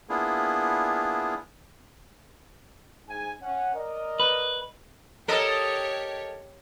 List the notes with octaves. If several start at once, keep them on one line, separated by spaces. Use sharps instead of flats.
A#3 B3 D4 E4 F4 G#4
G#2 G#5
C#4 F#5
A#4 D5 D#5
B4
G4 A4 A#4 C#5 D#5